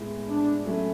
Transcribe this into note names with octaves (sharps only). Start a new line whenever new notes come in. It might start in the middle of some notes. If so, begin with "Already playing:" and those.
Already playing: A2 G#3 B3
D4
F#3 A3 C#4 E4